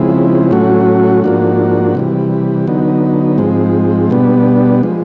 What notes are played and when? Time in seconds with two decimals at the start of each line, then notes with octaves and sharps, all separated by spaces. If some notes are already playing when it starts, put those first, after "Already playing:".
Already playing: C#3 F3 G#3 C4 E4
0.51 A2 F#3 A3 C#4 F#4
1.24 G#2 F3 A#3 D4 F#4
1.95 C3 E3 G3
2.67 D3 F#3 B3 D#4
3.38 G#2 F3 G#3 C4
4.10 B2 G3 B3 D4
4.83 F3 G#3